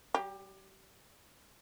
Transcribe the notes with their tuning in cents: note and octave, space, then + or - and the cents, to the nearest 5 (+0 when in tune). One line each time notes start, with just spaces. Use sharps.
G3 -40 G4 +20